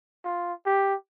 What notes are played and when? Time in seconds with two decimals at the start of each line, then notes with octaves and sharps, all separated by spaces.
0.25 F4
0.66 G4